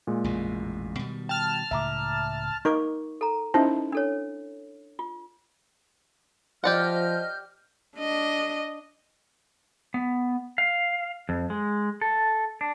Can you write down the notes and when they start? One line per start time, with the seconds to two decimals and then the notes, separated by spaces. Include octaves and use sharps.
0.07 A#2 G#3
0.24 A1 F2 B2
0.99 B2 D#3 G3
1.29 G5 A5 F6
1.71 C#2 A2 C#3 E5 A#5 D6
2.65 D#4 A#4 C#6 D6
3.21 A4 A#5
3.54 C#4 D#4 E4 C5
3.92 D4 A4 C#5
4.99 F4
6.64 F3 G4 D5 D#5 F#5 F6 G6
7.98 D4 D#5
9.94 B3
10.58 F5
11.29 F2
11.50 G#3
12.01 A4
12.61 D4